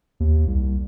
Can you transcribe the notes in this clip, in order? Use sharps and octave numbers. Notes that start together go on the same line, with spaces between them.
D#2
C2